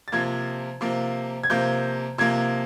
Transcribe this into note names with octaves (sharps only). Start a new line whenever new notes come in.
A6
C3 F3 A#3 G#6
C3 F3 A#3
G#6
C3 F3 A#3 G6
C3 F3 A#3 G#6